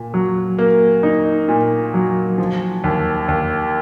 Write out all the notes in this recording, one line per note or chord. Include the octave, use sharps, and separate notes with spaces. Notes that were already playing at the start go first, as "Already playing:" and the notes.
Already playing: A#2
F#3
A#3
D#4
A#2
F#3
F3
D#2
D#2